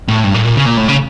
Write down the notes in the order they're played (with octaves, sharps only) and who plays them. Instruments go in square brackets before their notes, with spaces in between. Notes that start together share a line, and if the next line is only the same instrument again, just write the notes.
[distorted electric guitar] A2
G2
A2
A#2
C#3
A#2
A2
C#3